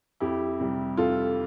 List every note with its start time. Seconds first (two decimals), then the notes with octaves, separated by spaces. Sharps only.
0.20 F2 E4 G4
0.60 C3 G3
0.97 F2 F4 A4